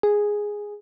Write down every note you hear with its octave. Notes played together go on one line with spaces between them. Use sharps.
G#4